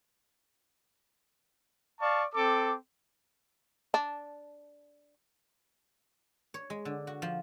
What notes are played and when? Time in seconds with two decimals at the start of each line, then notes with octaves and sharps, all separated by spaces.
2.00 D5 F5 A5 C#6
2.35 C4 A4 D6
3.94 D4
6.54 C#5
6.70 G#3
6.85 D3
7.07 F#4
7.22 F3